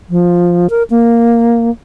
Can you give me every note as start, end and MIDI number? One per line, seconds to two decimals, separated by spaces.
0.10 0.67 53
0.70 0.83 70
0.90 1.70 58